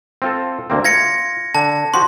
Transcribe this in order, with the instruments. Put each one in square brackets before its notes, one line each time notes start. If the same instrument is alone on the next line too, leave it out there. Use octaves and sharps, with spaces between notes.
[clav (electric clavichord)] C4 F4 A4
D2 A#3 C4
[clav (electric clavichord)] F4 [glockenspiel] G#6 A#6 C#7
[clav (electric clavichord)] D3 [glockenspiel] A5
[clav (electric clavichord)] F3 F#4 G4 [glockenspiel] C6